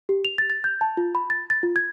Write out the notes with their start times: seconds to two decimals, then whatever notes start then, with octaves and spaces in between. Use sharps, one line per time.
0.09 G4
0.25 F7
0.38 A6
0.50 A6
0.64 G6
0.81 A5
0.97 F4
1.15 B5
1.30 A6
1.50 A6
1.63 F4
1.76 G#6